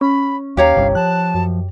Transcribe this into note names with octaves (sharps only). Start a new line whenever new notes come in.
C#4 B5
D#2 G4 C#5 F5 A#5
G1 C2 G2
F3 A5 F#6
F#2